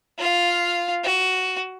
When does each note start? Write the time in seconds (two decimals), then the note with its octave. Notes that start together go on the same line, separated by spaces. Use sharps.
0.18 F4 F5
1.04 F#4